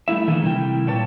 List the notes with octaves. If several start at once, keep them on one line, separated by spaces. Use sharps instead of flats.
G3 A3 E4 E5
D#3 E3 A3 A#3 D4 G#4
C3 G3 E4 A#4 G5
A#2 G3 B4 C#5 G5 A5